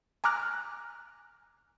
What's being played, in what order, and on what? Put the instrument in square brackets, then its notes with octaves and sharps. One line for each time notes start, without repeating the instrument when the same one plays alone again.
[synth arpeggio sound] G#5 A#5 D6 F6 F#6 A#6